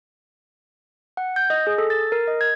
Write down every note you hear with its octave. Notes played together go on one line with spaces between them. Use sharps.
F#5
G6
D#5
G#4
A4
A6
A#4
D#5
G#6